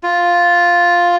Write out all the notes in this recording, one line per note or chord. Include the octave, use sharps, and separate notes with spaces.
F4